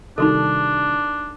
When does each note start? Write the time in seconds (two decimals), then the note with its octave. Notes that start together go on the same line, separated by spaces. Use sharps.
0.18 C3 D#3 G3 D4 D#4 F#4 A4